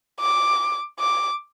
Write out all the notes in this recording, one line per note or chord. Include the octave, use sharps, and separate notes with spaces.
D6
D6